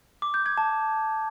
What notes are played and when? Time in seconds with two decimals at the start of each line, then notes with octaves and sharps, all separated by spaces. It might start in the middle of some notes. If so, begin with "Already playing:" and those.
0.22 D6
0.34 G6
0.46 G#6
0.58 A5